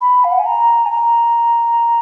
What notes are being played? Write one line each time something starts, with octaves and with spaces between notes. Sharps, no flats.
B5
F5
F#5
G#5
A#5
G#5
A#5